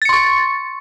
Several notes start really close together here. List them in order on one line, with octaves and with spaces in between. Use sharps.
A6 C#7 C6 C#6